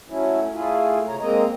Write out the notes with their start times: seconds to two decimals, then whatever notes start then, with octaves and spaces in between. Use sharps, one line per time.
0.09 F#3 A3 C#4 E4
0.54 A3 E4 F4 G#4
1.07 C3 C#5 A#5
1.20 G#3 A#3 C4 D#5 A#5